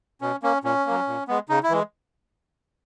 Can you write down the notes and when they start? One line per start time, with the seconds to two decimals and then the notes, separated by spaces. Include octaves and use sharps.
0.21 B2 C#4
0.43 A#3 C#4
0.64 A#2 C#4
0.86 F#3 A#3
1.07 A#2
1.28 G#3 B3
1.49 C#3 D#4
1.63 E4
1.70 E3 G#3